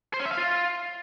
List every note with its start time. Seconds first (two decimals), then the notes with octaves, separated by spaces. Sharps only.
0.14 C5
0.20 C#4
0.25 E5
0.31 F5
0.37 F4